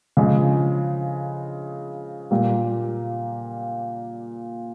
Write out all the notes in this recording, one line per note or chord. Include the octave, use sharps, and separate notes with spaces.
C#3 F3 G#3
A#2 G3 A#3